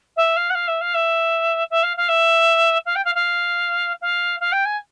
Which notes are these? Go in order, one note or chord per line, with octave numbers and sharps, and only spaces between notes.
E5
F5
F#5
F5
E5
F5
E5
E5
F5
F5
E5
F5
G5
F5
F5
F5
F5
G5
G#5